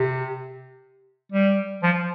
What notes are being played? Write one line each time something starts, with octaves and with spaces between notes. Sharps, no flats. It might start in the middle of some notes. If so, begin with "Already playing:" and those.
Already playing: C3
G3
F3